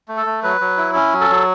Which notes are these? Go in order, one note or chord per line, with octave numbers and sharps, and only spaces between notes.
A3
A4
A3
F#3 B4
F#3
E4
C#4
F#3
A4
F#3